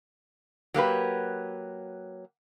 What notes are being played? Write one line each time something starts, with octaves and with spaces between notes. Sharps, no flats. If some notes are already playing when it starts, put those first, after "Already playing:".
F#3 A#3 G4 B4